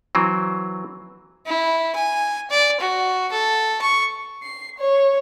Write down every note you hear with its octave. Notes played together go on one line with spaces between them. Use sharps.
E3 F#3 C4
E4
G#5
D5
F#4
A4
C#6
C7
C#5